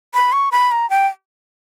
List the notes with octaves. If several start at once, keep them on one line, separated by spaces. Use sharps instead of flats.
B5
C#6
B5
A#5
G5